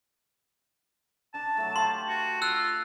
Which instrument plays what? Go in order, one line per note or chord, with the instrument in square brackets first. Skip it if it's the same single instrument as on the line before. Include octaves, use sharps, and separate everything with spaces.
[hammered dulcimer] D4 A#5 [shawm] A5
[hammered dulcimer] F#3 A3
[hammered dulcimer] G4 F5 [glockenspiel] C6
[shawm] F#4
[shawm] F4 [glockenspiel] E6 F#6